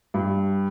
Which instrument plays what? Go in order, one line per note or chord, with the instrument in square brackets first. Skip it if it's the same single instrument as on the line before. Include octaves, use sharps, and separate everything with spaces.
[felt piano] G2